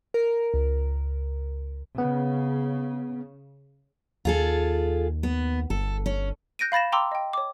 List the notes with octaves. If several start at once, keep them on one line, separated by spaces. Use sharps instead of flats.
A#4
C#2
C#3 B3
D#2 F4 G#4 A4
B3
G1 A4
C#4
F#6 G6 A#6 D7 D#7
F5 B5 A6 A#6 E7
G5 A#5 C6 D6 E6
D#5 G5
C#5 D6